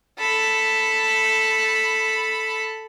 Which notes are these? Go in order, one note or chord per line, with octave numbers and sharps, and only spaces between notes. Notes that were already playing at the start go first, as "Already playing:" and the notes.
A4 B5